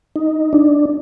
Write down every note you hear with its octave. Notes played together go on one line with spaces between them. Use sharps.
D#4
D4